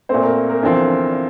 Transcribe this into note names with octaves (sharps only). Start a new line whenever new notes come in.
A#2 A3 C4 C5
A#4
A#4
E2 D3 F3 C4